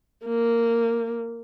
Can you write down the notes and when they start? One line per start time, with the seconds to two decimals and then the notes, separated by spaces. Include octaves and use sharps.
0.25 A#3